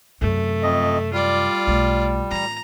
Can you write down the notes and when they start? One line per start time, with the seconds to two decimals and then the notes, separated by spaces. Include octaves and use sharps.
0.21 F#2 C3 A3
0.63 F2 D#5
1.13 G3 F4 D5
1.67 B1 A3
2.31 A2 E3 A#5